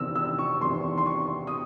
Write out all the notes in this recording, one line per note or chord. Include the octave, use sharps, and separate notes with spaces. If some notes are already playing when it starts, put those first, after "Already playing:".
Already playing: E2 C3 D#3 E6
E6
C#6
E2 C3 D#3 C6
C6
C#6
D#6